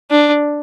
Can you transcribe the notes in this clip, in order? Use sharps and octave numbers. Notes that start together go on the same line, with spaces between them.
D4